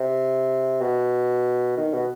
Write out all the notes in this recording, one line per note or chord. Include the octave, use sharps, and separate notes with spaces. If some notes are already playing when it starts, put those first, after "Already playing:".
Already playing: C3
B2
D#3
B2